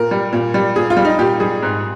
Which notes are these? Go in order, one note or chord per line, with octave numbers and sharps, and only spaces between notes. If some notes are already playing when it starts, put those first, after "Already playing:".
Already playing: A#2 A#4
G3
A#2
G3
A#2 G#4
F4
G3
D#4
A#2 G4
G3 G#4
G#2